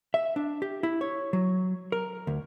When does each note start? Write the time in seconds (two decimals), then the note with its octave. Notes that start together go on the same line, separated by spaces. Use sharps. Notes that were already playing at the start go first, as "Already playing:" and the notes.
0.14 E5
0.36 D4
0.62 G4
0.83 E4
1.01 C#5
1.33 F#3
1.92 A#4
2.27 D2